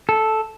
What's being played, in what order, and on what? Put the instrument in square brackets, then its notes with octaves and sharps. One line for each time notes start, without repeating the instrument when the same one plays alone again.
[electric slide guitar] A4